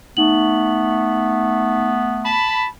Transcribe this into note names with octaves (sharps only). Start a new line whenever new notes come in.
A3 B3 D#4 F#7
A5 B5